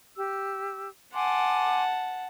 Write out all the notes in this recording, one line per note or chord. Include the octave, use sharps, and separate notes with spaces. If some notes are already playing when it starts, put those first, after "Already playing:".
G4 E6
F#5 G#5 A5 C6 D6